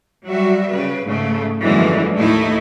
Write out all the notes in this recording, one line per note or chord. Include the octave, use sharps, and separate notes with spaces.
F#3 G3 F#4 E5
C#3 B4
G#2 C#3 A3
F#2 D3 E3 F3 G#3 A#3
D#2 A2 A3 D#4 E4